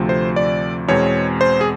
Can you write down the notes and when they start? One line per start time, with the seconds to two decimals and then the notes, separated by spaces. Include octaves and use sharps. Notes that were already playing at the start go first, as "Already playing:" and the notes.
Already playing: D2 C3 F3 A3 C4
0.09 C5
0.36 D5
0.88 E2 B2 G#3 C4 C#5
1.41 C5
1.61 G#4